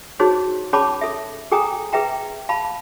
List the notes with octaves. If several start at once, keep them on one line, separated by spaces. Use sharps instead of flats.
D#4 F#4 G#4 C5 C#5
C#4 G#4 C#5 A5 B5 D6
A4 E5
G#4 A4 G5 G#5 A#5 D#6
G#4 B4 E5 G5 A#5
F5 A5 B5